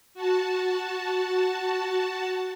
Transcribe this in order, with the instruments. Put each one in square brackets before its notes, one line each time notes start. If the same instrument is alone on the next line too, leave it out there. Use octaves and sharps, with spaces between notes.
[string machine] F#4 A5